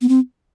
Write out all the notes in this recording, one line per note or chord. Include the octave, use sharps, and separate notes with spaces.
B3
C4